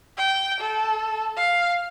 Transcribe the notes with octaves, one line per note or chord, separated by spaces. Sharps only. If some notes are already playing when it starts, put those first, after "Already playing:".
G5
A4
F5